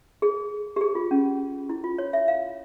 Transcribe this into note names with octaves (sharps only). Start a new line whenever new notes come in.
G#4
G4
G#4
F4
C#4
E4
F4
C#5
E5
F5